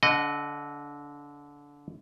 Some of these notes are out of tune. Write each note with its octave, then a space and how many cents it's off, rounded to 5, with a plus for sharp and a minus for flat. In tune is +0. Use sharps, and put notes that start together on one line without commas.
D3 -25 D#5 -15 F#5 +15